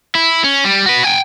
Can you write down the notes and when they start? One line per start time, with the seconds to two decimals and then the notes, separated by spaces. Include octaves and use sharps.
0.15 E4
0.44 C#4
0.64 G3
0.86 F#4 B4
1.04 G5 G#5